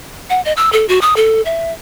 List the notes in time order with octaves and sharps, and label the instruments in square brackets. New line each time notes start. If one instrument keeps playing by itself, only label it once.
[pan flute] F#5
D#5
E6
A4
F#4
D#6
A4
E5